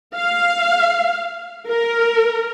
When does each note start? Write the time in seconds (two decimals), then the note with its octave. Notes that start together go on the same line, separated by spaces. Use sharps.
0.15 F5
1.68 A#4